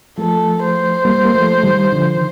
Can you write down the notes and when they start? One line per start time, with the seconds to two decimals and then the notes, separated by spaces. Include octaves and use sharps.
0.18 F3 A3 A4
0.62 C5
1.05 G3 A#3
1.25 A#3
1.34 F3 A3
1.58 A3
1.63 D#3 G3
1.92 D3 F3
2.16 D#3